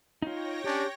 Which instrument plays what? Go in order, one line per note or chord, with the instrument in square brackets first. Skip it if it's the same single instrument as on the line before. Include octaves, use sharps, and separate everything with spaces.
[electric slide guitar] D#4 F4 [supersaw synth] C#5 G5 A#6
[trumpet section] C#4 D4 [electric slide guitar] G4